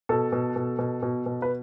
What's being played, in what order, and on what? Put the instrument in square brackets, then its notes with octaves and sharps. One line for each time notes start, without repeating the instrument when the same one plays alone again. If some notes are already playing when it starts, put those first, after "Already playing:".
[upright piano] B2 A4
B2
B2
B2
B2
B2
B4